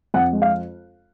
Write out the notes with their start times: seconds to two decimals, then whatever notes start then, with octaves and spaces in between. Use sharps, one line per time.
0.14 F2 F#5
0.33 G#3
0.42 F5